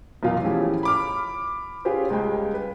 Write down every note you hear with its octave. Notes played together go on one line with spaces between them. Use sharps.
B1 E2 A#2 F4 F5
E3 F3 C#4 E4 G4 G#4
B5 D6 F6
C#4 F4 G4 G#4 B4 C5
C#2 G3 G#3 G5
B4